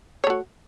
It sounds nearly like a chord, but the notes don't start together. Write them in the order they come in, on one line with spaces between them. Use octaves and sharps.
C#5 A3 F#4